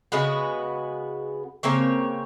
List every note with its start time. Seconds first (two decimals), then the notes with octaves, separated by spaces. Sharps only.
0.12 C#3 G#3 B3 F#4
1.63 C#3 A#3 C4 C#5